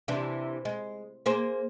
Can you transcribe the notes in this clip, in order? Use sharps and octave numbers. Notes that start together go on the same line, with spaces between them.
C3 E3 D4
G#3
A#3 G#4 C5